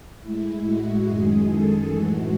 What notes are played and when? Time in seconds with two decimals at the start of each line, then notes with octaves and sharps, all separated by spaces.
0.22 A2 G#3 E4
0.64 F#4
1.05 F#2 D#3 G#3 G#4
1.47 A4
1.89 A2 E3 G#3 F#4